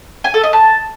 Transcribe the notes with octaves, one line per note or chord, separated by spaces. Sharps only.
G#5
A4
D#5
A5